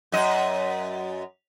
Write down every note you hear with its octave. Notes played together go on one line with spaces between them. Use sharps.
F#2 D#5